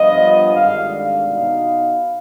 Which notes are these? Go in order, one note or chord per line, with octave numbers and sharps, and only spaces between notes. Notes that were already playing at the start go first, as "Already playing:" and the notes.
Already playing: G2 F3 B3 F4 D#5
G#1 G2 D3 F5
F5
B2 B3 D#4